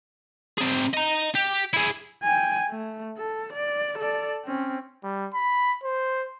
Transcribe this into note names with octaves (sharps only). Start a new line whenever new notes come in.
C4 G#4
D#5 A#5
G4
E4 G#4
G5 G#5
A3
A4
D5
A4 D5
C4 C#4
G3
B5
C5